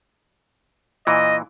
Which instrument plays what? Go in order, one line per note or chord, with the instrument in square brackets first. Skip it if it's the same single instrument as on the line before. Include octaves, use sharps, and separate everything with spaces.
[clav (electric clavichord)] A#2 E3 [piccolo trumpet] D#5